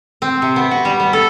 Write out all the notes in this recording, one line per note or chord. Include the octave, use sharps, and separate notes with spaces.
C4
C3
B3
F#4
G3
B3
A4